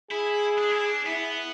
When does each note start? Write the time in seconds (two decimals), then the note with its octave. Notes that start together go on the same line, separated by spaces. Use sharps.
0.11 E4 G#4
0.58 D4
0.71 E4
0.85 D4
1.06 B3 E4